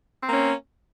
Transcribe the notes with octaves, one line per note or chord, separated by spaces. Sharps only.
A#3 C4 C#4